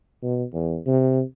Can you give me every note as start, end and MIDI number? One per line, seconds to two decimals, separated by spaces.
0.23 0.44 47
0.53 0.78 40
0.87 1.22 48